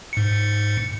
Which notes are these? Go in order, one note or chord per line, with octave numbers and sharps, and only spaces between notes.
G#2 C#7